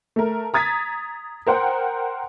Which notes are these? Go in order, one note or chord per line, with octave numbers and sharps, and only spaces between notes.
A3 A#4
A#5 D#6 G#6 A6 B6
A#4 C5 F#5 G5